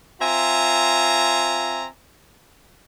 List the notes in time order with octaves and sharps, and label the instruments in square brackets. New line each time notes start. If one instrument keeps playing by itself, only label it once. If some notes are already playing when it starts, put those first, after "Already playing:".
[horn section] C4 F4 E5 G#5 A#5